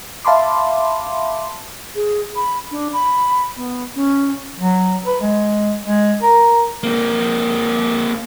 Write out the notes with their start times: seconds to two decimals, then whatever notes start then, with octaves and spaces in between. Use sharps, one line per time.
0.25 E5 F5 A5 B5 C6 D6
1.96 G#4
2.36 B5
2.71 D4
2.93 B5
3.57 B3
3.95 C#4
4.60 F#3
5.06 B4
5.21 G#3
5.85 G#3
6.22 A#4
6.83 A#3 C4